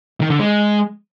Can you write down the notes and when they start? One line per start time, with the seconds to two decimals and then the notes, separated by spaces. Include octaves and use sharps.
0.21 D#3
0.30 D3
0.39 G#3